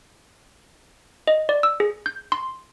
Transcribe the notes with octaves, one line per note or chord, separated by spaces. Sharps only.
D#5
D5
E6
G#4
G6
C6